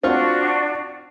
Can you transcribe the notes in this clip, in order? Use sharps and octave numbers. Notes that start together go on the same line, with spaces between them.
C4 D4 F4 F#4 D5 C#6